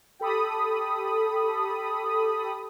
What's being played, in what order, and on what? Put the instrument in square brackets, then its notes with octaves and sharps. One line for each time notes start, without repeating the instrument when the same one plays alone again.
[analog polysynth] G4 A4 B5 D#6